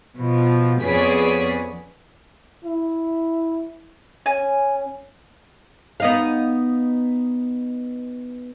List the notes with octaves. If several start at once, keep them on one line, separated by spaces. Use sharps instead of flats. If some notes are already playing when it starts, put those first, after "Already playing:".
B2 F3
F2 B3 C#4 G#4 D5 B6
E4
C#4 G#5
B3 D#4 F5